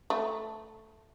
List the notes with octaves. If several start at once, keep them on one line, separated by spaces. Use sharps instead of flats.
A3